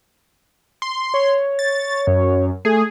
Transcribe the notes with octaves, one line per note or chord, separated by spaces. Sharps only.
C6
C#5
A6
F#2
A3 G#4